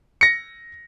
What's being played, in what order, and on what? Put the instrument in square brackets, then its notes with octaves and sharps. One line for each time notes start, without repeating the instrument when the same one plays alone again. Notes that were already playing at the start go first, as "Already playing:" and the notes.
[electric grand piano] A#6 C#7